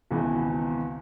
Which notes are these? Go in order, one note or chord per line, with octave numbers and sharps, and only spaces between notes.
G#1 C#2 B2 E3